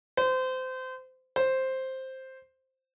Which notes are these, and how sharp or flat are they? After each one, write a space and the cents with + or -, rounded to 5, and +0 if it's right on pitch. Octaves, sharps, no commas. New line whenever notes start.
C5 -25
C5 +5